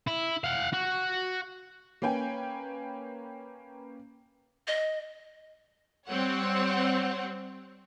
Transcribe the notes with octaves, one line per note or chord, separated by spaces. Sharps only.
E4
F5 F#5
F#4
A#3 C#4 B4 G5 G#5
D#5
G3 C4 C5 C#5 F#5